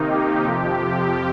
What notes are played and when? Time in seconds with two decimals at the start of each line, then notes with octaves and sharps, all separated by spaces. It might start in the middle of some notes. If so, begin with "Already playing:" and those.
Already playing: C3 D#3 A#3 D#4
0.08 G4
0.44 F2 C3 F3